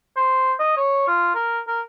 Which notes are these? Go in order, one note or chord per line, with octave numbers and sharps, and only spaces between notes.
C5
D#5
C#5
F4
A#4
A#4